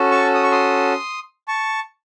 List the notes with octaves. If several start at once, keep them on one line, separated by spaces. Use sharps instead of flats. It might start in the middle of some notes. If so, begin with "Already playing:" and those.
Already playing: C#4 F#4 A4
A5 C#6
D#6
C#6
C6 D#6
A5 C#6